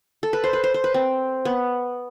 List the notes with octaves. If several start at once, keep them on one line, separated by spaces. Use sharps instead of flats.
A4
B4
C5
B4
C5
C5
B4
C4
B3